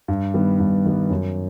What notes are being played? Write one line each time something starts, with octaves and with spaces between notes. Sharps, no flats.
G2
D#3 G3 B3
G2
D#3 G3 B3
F#2